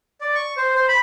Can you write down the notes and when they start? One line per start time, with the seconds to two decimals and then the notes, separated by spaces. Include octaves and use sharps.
0.21 D5
0.35 C#6
0.57 C5
0.75 C5
0.88 B5